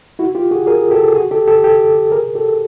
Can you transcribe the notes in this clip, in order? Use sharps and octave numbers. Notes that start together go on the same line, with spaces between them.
E4 F#4
F4 G4
F#4 G#4
G#4 A#4
G4 A4
F#4 G#4
G4 A4
G4 A4
G4 A4
G#4 A#4
G4 A4